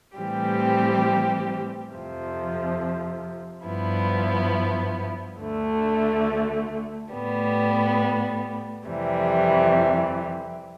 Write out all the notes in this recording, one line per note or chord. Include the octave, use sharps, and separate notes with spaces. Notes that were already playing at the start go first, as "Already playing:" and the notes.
A2 E3 G3 C4 G4
F2 C3 F3
G2 F3 B3 E4
D2 D3 A3
A2 G3 B3
F2 C3 E3 G3